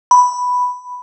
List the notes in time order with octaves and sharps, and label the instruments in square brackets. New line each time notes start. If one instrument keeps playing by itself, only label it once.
[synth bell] B5